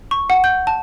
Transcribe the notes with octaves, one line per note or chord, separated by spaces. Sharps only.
C#6
F#5
G6
A5